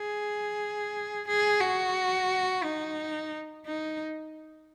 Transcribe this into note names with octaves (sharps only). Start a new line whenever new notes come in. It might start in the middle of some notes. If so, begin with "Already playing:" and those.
Already playing: G#4
G#4
F#4
D#4
D#4